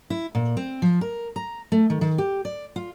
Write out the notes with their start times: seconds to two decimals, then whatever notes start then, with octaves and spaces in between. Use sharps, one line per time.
0.10 E4
0.35 A#2
0.57 C4
0.82 F3
1.01 A#4
1.36 A#5
1.72 A3
1.90 D#3
2.01 D#3
2.18 G4
2.45 D5
2.76 F4